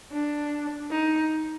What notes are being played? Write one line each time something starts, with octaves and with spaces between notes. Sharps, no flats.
D4
D#4